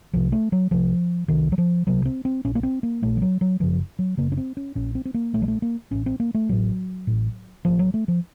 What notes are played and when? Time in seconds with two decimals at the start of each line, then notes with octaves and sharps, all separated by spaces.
0.13 C2 C3 F3
0.32 A3
0.52 F#3
0.71 C2 C3 F3
1.28 C2 C3 D#3
1.52 F#3
1.58 F3
1.87 C2 C3 F#3
2.05 C4
2.25 C4
2.45 A#1 A#2 C#4
2.55 A#3
2.63 C4
2.83 A#3
3.02 A#1 A#2 A3
3.17 F3
3.22 F#3
3.41 F#3
3.60 F#1 F#2 C#3 F3
3.99 F#3
4.17 F#1 F#2 C#3 A#3
4.32 C#4
4.37 C4
4.57 C#4
4.75 A#1 A#2 C#4
4.95 C4
5.05 C4
5.14 A#3
5.33 A#1 A#2 A3
5.42 F#3
5.48 A3
5.62 A#3
5.91 A1 A2 C#4
6.06 C4
6.20 A#3
6.34 A3
6.49 A1 A2 F#3
7.07 A1 A2
7.65 A1 A2 F3
7.79 F#3
7.94 A3
8.08 F3